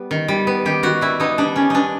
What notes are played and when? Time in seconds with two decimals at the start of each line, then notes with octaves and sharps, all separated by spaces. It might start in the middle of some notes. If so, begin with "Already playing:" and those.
Already playing: G3 B3
0.11 D#3
0.28 G3
0.47 B3
0.65 D#3 G4
0.83 D#3 F#4
1.01 G3 E4
1.20 B3 D#4
1.38 G3 D4
1.56 D#3 C#4
1.70 B3 D4 D#4